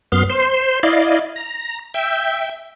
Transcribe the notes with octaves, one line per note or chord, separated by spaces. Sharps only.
F#2 B3 C6 F6
C5 C6
E4 D5 D#5 F5
A#5
E5 G5